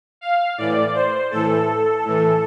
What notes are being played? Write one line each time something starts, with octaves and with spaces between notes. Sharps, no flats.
F5
A2 E3 D5
C5
A2 E3 A4
A2 E3